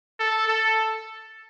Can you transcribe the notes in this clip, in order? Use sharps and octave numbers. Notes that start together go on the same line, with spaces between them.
A4
A4